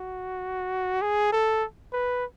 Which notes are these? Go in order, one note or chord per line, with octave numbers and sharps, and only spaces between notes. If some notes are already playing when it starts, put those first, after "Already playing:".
Already playing: F#4
G#4
A4
B4